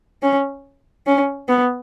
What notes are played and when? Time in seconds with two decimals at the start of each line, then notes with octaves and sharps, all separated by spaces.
0.23 C#4
1.07 C#4
1.48 B3